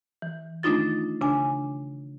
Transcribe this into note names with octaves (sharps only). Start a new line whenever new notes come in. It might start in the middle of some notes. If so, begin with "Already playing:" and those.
E3
D#3 A3 D4 D#4 F4 A6
C#3 D4 G#5